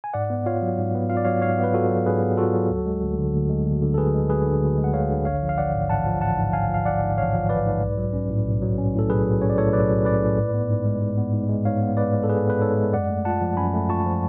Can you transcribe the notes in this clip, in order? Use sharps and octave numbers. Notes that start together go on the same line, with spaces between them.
G#5
G#2 D5 F#5
B3
F4 C#5 F5
F#3
G#2
B3
F4 F5
D5
F#3 C#5 F5
G#2 C#5 F5
B3
B4
F4 F#4 A4
F#3
G#2 G#4 B4
B3
F4 F#4 A4
F#3
D2
G#3
D2
D3
D2
G#3
D2
D3
A4
D2 G#4 B4
G#3
D2 G#4 B4
D3
D2
G#3
F#5
D2 C#5 F5
D3
A1 C#5 F5
F3
F5
A1 D5 F#5
G#2
A1 F#5 A5
F3
A1 F#5 A5
G#2
A1 F5 G#5
F3 F5
A1 D5 F#5
G#2
A1 C#5 F5
F3
A1 B4 D5
G#2
B1
F#3
C#4
A2
B1
F#3
C#4
A2 A4
B1 G#4 B4
F#3
C#4 C#5
D5
A2 A4 C#5
B1 B4 D5
F#3
C#4 B4 D5
A2
G#2
B3
G#2
G#3
G#2
B3
G#2
G#3
G#2 C#5 F5
B3
G#2 B4 D5
G#3
A4
G#2 G#4 B4
B3 B4
G#2 A4 C#5
G#3
F#2 D5 F#5
A3
F4 F#5 A5
F3
F#2 G#5 B5
A3
F4 A5 C#6
F3